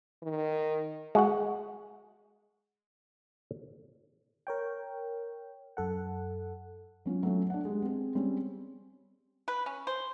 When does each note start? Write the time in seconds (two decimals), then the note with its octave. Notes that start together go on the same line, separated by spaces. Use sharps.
0.23 D#3
1.15 G#3 F#4 F#5
4.47 A#4 C#5 G5
5.77 F#2 A4 F#5
7.06 F#3 C#4 F4
7.23 F#3 A3 C#4
7.50 D4 F#5
7.65 G#3 G4
7.82 C4 G#4
8.15 G3 C4 C#4
9.48 B4
9.66 C#4
9.87 C5